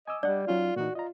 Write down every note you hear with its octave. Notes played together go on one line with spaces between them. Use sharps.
D#5 G#5 D6 E6
G3 D4 D5 D#5 F#5
F#3 C#4 D#4 F4
A#2 E3 D#4 F#4
F4 D#5 A#5